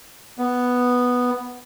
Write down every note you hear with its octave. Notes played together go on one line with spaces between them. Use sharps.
B3